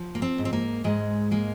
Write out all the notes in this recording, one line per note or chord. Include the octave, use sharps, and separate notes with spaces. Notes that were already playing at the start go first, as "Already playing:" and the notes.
Already playing: F3
A#3
C4
G#2
C4
A#3
G#2 G#3
G#3 A#3